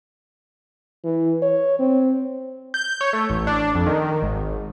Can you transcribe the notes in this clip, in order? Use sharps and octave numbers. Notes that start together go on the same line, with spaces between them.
E3
C#5
C4
G6
C#5
A3
A1
D4
F2
D#3
G#1